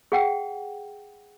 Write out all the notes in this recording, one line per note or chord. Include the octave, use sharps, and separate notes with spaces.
G#4 F#5 G5